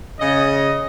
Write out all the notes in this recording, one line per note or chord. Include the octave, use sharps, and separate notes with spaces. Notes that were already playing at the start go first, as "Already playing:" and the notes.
C#3 D#5